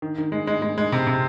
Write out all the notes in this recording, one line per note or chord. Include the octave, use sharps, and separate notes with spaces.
D#3
D#3
G#3
G#3
G#3
G#3
C3
C3